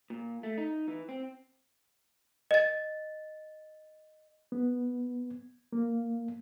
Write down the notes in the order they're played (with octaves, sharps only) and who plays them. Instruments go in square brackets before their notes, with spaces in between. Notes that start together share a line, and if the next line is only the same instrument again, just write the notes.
[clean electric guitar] A#2
A3
D#4
E3
C4
[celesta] D#5 A6
[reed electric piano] B3
A#3